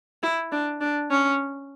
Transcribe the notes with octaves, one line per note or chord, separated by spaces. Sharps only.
E4
D4
D4
C#4